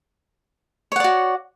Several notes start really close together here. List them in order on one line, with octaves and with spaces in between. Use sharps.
C#5 F#5 D5 F#4